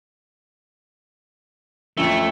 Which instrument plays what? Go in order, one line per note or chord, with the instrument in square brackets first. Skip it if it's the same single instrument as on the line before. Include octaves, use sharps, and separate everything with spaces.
[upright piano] F2 C#4 E5 [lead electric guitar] A3